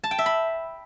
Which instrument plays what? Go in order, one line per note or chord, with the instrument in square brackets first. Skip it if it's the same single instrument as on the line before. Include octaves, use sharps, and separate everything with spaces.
[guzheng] A5
G5
E5
B5